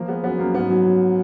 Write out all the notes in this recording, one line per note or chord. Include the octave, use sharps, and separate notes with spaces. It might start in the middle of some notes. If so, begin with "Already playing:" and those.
Already playing: F3 A#3
G#3 B3
F#2 B3
F#2 A#3
G#2 B3
F#3
F#3